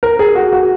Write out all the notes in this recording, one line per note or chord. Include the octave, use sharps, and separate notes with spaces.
A#4
G#4
F#4
F#4